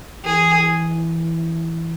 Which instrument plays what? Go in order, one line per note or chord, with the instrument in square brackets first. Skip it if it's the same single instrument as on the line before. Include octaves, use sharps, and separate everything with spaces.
[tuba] E3 [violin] G#4